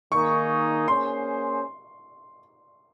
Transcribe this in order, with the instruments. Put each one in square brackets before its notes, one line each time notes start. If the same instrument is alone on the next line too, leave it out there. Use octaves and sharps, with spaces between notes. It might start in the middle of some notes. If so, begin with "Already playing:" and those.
[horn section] D#3 A#3 D#4 G#4 [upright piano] C#6
[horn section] A#3 C#4 G#4 C5 [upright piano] C6